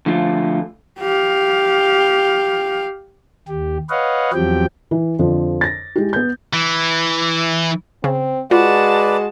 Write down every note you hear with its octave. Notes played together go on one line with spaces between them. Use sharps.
D3 F3 A3 F4
G4 F5
D#2 G4
B4 C#5 D#5 F5 F#5
E2 F3 F#3 C4 G4 G5
E3
F2 D3 F3
A6 A#6
G#3 E4 G4
B3 G6
E3
C#3 C4
G#3 F4 F#4 B4 D5 A5